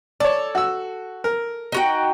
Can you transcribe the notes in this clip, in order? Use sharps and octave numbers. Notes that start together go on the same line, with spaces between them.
A4 C#5 D5
F#4 E6
A#4
D#4 F#4 G5